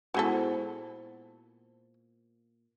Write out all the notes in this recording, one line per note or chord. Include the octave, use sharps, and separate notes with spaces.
A#2 G#3 B3 E4 F#4 G#4 A4 C5